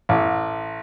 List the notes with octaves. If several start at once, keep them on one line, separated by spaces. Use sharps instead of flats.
A1